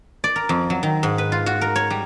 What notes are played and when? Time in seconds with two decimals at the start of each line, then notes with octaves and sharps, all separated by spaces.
0.24 D5
0.36 A#4
0.49 F2
0.70 F#3
0.83 D#3
1.03 G#2
1.18 B4
1.32 F4
1.46 F#4
1.61 A#4
1.76 C#5
1.90 G3